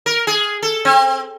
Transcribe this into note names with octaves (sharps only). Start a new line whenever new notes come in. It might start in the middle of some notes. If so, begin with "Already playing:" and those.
A#4
G#4
A4
C4